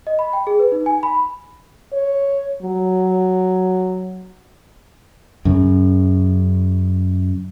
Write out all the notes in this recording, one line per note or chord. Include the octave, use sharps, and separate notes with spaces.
D#5
B5
G5
G#4
B4
D#4
G#5
B5
C#5
F#3
F#2 C#3